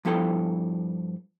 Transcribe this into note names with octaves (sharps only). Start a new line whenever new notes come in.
G2 F3 B3 E4 A4 G5